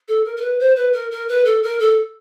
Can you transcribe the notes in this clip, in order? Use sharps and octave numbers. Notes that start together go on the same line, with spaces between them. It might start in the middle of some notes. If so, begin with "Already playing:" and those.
A4
A#4
A#4
B4
C5
B4
A#4
A#4
B4
A4
A#4
A4